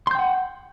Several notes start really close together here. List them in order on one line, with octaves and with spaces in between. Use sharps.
C6 G6 G5 F#5